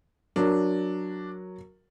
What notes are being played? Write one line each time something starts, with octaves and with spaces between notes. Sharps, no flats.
F#3 D4 A#4